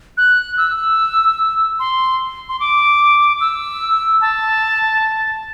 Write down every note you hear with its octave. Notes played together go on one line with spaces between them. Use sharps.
F#6
E6
C6
C6
D6
E6
A5